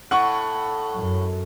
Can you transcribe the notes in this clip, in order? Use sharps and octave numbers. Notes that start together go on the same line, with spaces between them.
A2 F#5 C#6
F#2